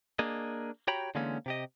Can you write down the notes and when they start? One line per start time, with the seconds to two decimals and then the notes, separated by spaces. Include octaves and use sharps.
0.19 A#3 D4 G#4 D#5
0.87 F#4 G4 C#5 G5 A#5 B5
1.15 D3 E3 G#3 A#3 B3 C#4
1.46 C3 G4 D#5